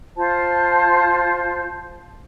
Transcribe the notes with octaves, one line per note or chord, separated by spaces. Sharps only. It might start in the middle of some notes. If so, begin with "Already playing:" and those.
F4 C5 A5